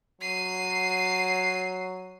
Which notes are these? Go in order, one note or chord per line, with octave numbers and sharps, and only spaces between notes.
F#3 C7 D#7